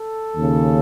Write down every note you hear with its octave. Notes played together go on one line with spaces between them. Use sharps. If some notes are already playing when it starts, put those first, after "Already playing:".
Already playing: A4
D#2 C#3